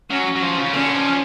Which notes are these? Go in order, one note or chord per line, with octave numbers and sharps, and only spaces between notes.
F#3 C#4
F#3
F3
C#3
D3 C#4
F3